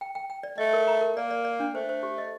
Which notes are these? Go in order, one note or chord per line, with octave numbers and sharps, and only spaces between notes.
G5
G5
G5
D5
A3 D#5
A#4
A#5
A#4
A#3 D5
D5
D5
D4
A3 C5
C5
G4
D#5